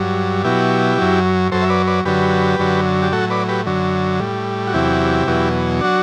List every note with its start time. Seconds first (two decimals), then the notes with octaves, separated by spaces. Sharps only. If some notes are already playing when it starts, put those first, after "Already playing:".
Already playing: G2 F#3
0.44 B2 F#3 E4 G4
0.98 F#2 F#3
1.52 F#2 F#3 A4 C5
1.62 E5
1.70 B4 D5
1.87 B4 D5
2.05 F#2 D3 F#3 G4 B4
2.59 F#2 D3 F#3
3.02 G4
3.13 A2 F#3 F#4 A4
3.30 B4 D5
3.49 G4 B4
3.66 F#2 D3 F#3
4.20 A2 G3
4.67 F#4
4.74 E2 C3 F#3 E4 G4
5.27 E2 B2 F#3
5.81 F#3 D4 F#4